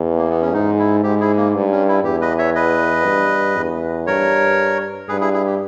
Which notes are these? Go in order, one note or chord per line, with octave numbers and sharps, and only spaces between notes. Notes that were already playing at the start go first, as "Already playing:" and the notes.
Already playing: E2
A#3
B3
C#4
G#2 D#4
E4
G#2 G4
E4 G#4
A#3
G2
C#4
E4
E2 G4
B4 D#5
C#5 E5
B4 D#5
G2
E2
G2 A#4 C#5
G2 G#4 B4
E4 G#4
E4 G#4
G4